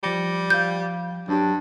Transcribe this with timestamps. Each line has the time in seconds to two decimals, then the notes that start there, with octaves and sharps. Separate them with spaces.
0.03 F3 G3 A#6 C#7
0.50 F3 F5 G6
1.29 G2 F#3 D4 G4